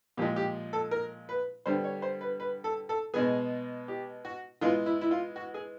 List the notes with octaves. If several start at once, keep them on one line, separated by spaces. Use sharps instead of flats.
A#2 F3 G#3 G4
G4
A4
A#4
B4
D3 G3 B3 C5
C#5
C5
B4
B4
A4
A4
B2 G#3 B3 G#4
G4
F#4
E3 G#3 B3 F4
E4
E4
F4
F#4
G#4